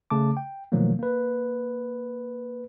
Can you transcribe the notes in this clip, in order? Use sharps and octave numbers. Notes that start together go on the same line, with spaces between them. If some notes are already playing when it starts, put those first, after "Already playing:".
C#3 A3 A5 D6
G5
B2 D#3 F3 F#3 A3 A#3
A#3 B4